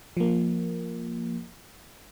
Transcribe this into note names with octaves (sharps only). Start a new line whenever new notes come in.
F3 A#3